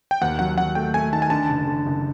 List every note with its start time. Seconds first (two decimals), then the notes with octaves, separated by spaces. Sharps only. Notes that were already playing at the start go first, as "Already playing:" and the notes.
0.11 G5
0.22 D#2 F#5
0.39 F#3 F#5
0.58 F#3 F#5
0.75 A3 G5
0.94 A3 G#5
1.13 D#3 A5
1.22 G#5
1.30 D3 A5
1.49 F#1
1.68 D3
1.86 F#1